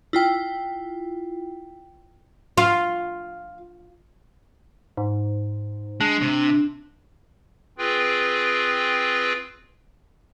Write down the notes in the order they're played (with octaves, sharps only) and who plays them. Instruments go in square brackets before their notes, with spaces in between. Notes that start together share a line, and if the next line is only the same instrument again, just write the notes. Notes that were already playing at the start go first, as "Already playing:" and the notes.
[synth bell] E4 F4 G5
[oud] F4
[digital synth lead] G#2
[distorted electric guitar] G#3 [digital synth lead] D4
[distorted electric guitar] C3
[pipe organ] C4 F4 G#4 B4 G5